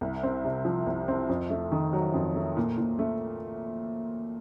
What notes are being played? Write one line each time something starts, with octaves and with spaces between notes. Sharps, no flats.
C2
C4
C3
F3
C2
C4
F2
A3
D#3
F#3
F2
A3
A#2
A#2
A3